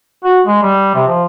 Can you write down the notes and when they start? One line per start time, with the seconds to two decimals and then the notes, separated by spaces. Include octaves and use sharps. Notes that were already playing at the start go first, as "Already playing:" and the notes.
0.24 F#4
0.47 G#3
0.62 G3
0.95 C3
1.07 F3